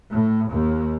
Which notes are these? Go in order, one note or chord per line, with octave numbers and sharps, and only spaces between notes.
A2
D#2